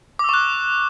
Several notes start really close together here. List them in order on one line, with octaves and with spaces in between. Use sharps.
D6 E6 C#6 F#6